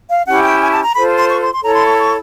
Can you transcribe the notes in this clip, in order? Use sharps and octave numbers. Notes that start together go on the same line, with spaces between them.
F5
C#4 E4 G4 F#5
G5
G#5
A5
A#5
F4 A4 C5 B5
C6
C#6
C6
C6
E4 A4 C#5 A#5
C6
C#6
C#6